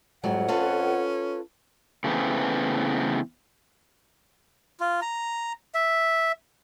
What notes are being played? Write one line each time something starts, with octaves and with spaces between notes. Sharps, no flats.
F2 G#2 F#3 G3 F#5
C#4 F4 A4 B4
C#3 E3 A3 B3 C4
F4
A#5
E5